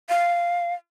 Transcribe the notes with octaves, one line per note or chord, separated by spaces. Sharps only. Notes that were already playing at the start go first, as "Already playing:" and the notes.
F5